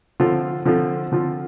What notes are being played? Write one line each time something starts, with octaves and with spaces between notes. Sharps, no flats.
D3 F3 C4 F4 A4
D3 F3 C4 F4 A4
D3 F3 C4 F4 A4